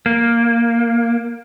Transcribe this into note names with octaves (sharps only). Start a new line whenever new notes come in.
A#3